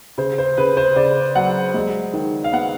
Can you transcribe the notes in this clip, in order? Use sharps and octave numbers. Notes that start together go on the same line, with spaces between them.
C#3 C5
C5
C#3 B4
C5
C#3 D5
F#3 F#5
G#3
D#3
F5
B3 F#5